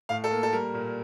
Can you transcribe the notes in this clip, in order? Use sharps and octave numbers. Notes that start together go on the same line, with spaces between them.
A2 F5
A4
A#3
A4
G3 A#4
A#2